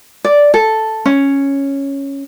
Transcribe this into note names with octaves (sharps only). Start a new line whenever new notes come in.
D5
A4
C#4